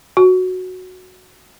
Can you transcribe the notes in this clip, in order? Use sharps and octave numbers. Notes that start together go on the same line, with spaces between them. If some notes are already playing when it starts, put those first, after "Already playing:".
F#4